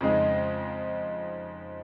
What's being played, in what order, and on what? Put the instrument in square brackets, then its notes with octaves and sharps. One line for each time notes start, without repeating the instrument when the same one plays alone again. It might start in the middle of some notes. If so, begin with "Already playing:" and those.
[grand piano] F2 C#3 G#3 D#4